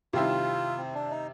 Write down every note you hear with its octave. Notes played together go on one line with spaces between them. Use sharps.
C3 D#3 G3 C4 E4 F4
C4
D4
D#4